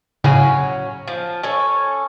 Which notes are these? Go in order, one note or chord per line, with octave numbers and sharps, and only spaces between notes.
A2 C#3 F#3 C#4
F3
C#4 A4 C#5